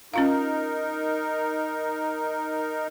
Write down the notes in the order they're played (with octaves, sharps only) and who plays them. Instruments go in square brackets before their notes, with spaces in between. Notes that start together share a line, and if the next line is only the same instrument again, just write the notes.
[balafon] C#4 F4 F5 [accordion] D#4 A#4